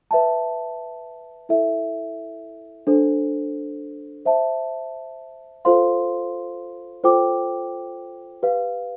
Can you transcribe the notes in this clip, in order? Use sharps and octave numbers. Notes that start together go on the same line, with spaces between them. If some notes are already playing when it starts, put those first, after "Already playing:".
B4 E5 A5
E4 A4 E5
D4 A4 C5
C5 E5 A5
F4 A4 C5 F5 C6
F4 A4 C5 G5 D6
G4 B4 F5